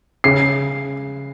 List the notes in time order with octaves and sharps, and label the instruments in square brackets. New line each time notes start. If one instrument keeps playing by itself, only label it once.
[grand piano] C#3 C7